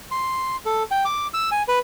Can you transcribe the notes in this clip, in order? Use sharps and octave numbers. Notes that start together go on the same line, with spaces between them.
C6
A4
G5
D6
E6
G#5
B4